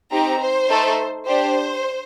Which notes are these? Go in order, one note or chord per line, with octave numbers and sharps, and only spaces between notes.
C4 D#4 G4 A#5
C5
A3 D#4 A4
D4 G4 C5